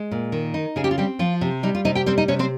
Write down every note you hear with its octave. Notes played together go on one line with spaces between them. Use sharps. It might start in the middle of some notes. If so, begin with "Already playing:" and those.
Already playing: G#3
A#2
D#3
D#4
C#3 G#4
G4
F4
G3 C4 G4
F3 F4
C3
G3 D#4
F4
C3 D#4 D#5
G4 G5
G3 C4 C5
D#4 D#5
C3 C#4 C#5
C4 C5